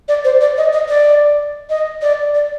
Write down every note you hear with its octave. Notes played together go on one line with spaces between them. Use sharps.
D5
C5
D5
D#5
D#5
D5
D#5
D5
D5